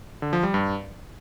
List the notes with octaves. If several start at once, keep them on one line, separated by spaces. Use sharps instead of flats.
D3
F3
G3
G2